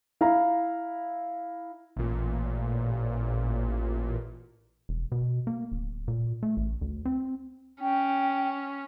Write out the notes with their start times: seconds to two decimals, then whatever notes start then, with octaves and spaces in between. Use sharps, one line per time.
0.21 E4 F5 A#5
1.97 A1 A#2
4.89 E1
5.12 B2
5.47 A#3
5.72 D1
6.08 A#2
6.43 A3
6.57 A1
6.81 D2
7.05 C4
7.82 C#4 G5